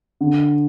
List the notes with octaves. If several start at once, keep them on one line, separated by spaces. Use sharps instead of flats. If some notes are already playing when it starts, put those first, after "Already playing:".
D3